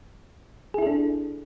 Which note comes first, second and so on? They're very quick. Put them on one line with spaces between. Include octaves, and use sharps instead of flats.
G#4 E4 A4 D4